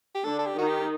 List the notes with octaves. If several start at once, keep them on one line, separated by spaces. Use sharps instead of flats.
G4
D3 D4 A4
A4
G4
D#3 D#4 F#4
G4